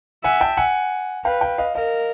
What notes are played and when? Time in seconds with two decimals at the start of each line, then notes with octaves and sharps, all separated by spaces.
0.24 E5 F#5 G#5
0.40 G5 A5
0.57 F#5 G#5
1.25 B4 F5 G5
1.41 F5 G5
1.58 D#5 F5
1.75 A#4 D#5 F5